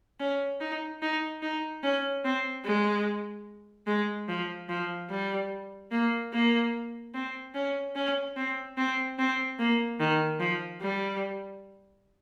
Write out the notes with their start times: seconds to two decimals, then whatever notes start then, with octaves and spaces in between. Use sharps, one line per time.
0.19 C#4
0.61 D#4
1.02 D#4
1.42 D#4
1.83 C#4
2.25 C4
2.65 G#3
3.87 G#3
4.28 F3
4.69 F3
5.10 G3
5.91 A#3
6.33 A#3
7.14 C4
7.55 C#4
7.95 C#4
8.36 C4
8.77 C4
9.18 C4
9.59 A#3
10.00 D#3
10.40 F3
10.81 G3